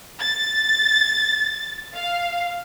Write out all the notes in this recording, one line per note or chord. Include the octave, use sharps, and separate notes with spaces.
A6
F5